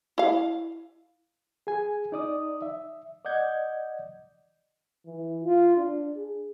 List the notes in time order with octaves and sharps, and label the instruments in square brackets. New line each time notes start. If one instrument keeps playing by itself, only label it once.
[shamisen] E4 F5
[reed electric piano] G#4 G#5
D#4 D5 D#6
E5
D5 D#5 F#5 G6 G#6
[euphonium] E3
F4
D4
G#4